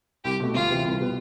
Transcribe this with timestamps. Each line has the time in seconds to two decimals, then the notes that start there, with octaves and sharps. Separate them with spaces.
0.25 C2 G4
0.40 B2 A3
0.54 D2 F4
0.70 C3 E3
0.85 C2
0.99 B2 G3 B3